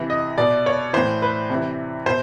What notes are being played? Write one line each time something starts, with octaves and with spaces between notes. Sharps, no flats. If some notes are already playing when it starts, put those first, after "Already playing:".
Already playing: C3 E3
D#5
B2 D5
C#5
A2 E3 C5
B4
C3 E3
B2 C5